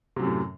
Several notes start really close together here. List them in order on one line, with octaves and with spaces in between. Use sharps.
C3 F#3 F#2 A2